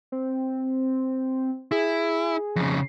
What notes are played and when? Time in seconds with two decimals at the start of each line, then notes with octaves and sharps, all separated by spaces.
0.12 C4
1.71 E4 G#4
2.56 F2 C#3